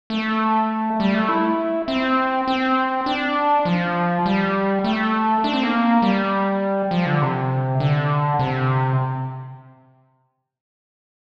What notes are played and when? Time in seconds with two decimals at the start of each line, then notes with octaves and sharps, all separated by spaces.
0.10 A3
1.00 G3
1.14 A3
1.29 E4
1.88 C4
2.48 C4
3.06 D4
3.65 F3
4.26 G3
4.84 A3
5.44 D4
5.53 C4
5.63 A#3
6.02 G3
6.91 F3
7.06 D3
7.22 C3
7.80 D3
8.39 C3